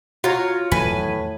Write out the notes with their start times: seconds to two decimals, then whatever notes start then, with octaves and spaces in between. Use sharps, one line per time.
0.24 F4 F#4 C#5 A#5
0.72 E2 A2 D#3 F#3 B4 G#5